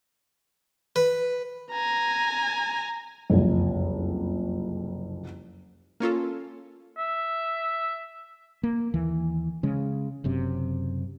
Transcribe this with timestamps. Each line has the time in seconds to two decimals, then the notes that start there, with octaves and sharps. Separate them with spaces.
0.96 B4
1.71 G#5 A#5
3.30 F#1 C2 F2
6.00 A#3 C#4 F4 A4
6.98 E5
8.63 A#3
8.94 D#2 E3
9.63 C#3 G#3
10.24 F#1 F#2 C3